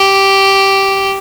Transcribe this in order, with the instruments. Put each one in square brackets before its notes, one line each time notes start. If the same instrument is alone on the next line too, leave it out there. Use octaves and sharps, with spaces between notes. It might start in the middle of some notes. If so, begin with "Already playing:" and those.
Already playing: [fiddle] G4